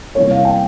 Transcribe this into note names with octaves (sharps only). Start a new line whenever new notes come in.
C3 E3 G3 A#3 E4 C#5
F5
G5